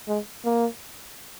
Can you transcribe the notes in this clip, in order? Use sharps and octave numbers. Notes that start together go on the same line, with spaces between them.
G#3
A#3